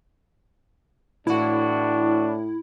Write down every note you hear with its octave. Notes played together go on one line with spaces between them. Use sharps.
A2 E3 D4 E4 F#4